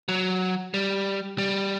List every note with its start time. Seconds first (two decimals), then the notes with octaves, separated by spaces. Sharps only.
0.09 F#3
0.74 G3
1.38 G3